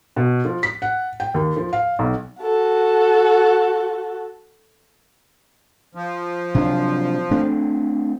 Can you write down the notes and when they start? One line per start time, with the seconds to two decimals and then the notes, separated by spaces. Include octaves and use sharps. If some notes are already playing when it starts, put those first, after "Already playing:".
0.16 B2
0.45 F3
0.63 B6
0.82 F#5
1.20 G5
1.34 D#2
1.57 F3
1.73 F5
1.99 B1
2.41 F#4 A4
5.95 F3
6.55 C3 F#3 D4
7.31 A3 C4 D4